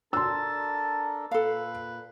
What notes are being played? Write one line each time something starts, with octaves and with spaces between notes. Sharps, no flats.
D4 A4 A#4 A5 C6 E6
A#2 A4 B4 F5